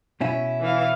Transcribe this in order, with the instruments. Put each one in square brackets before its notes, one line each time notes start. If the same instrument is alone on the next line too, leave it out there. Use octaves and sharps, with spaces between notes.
[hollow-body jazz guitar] B2 C#4 E4
[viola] E3 F5